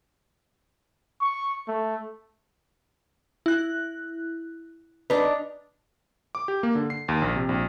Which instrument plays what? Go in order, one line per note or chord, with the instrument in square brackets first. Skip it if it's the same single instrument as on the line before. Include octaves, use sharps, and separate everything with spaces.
[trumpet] C#6
A3
[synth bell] E4 F#6
[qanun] D4 D#4 [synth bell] B4
[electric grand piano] D6
G4
A#3
D3
C7
D#2
A#1
C3
A#1